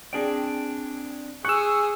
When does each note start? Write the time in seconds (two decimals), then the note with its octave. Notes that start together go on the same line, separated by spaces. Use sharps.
0.13 C4 D4 G#4 D5 G5
1.45 G#4 C#6 E6 F#6